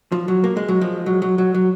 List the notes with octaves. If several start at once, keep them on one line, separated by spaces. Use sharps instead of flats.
F3
F#3
A#3
G#3
F#3
F3 G#3
F#3
F#3
F#3
F#3